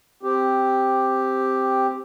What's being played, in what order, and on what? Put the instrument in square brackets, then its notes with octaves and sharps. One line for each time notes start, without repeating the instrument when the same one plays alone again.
[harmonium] C4 G4